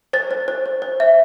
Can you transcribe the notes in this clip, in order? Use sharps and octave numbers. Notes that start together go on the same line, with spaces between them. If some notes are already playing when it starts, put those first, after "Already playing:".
C5 A6
C5
C5
C5
C5
E5